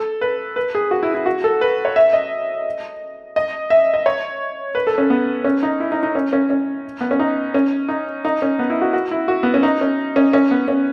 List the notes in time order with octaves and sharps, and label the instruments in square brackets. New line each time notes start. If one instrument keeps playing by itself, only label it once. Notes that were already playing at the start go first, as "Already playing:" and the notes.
Already playing: [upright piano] A4
B4
B4
G#4
F#4
E4
E4
F#4
A4
B4
C#5
E5
D#5
D#5
E5
D#5
C#5
B4
A4
C#4
B3
C#4
D#4
E4
D#4
D#4
C#4
C#4
C#4
B3
C#4
D#4
C#4
D#4
D#4
C#4
B3
E4
F#4
F#4
E4
F#4
B3
C#4
D#4
C#4
C#4
C#4
B3
C#4